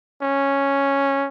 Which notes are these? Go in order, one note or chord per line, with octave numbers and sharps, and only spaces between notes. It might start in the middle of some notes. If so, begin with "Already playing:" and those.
C#4